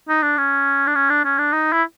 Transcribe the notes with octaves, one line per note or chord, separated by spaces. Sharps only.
D#4
D4
C#4
D4
C#4
D4
C#4
D4
D#4
E4